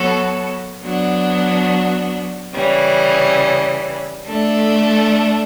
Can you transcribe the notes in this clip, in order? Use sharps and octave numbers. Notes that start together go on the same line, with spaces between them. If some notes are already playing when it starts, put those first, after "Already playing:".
Already playing: F#3 B3 F#4 A4 C#5
F#3 B3 D4 F#4
C#3 E3 G3 C#4
A3 D4 A4